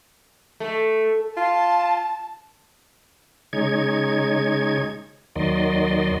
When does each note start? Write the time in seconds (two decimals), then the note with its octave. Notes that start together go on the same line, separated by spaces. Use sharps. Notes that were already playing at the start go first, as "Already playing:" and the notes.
0.60 A3
1.37 F4 A5
3.53 C#3 G#3 D#4 C#5 G#6
5.36 D#2 D#3 F#3 D5 D#5 C6